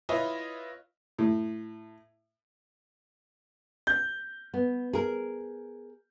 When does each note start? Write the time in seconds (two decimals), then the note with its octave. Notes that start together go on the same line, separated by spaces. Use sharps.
0.09 E4 F4 B4 C#5 D#5
1.19 A2
3.87 G6
4.54 B3
4.93 G#4 A#4